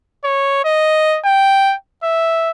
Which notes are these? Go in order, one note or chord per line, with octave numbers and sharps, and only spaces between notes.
C#5
D#5
G5
E5